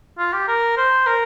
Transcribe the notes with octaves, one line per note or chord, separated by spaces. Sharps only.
F4
G4
A#4
C5
A#4